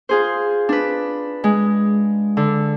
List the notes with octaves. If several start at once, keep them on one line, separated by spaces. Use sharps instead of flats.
F4 G#4 C5
D4 B4
G#3
D3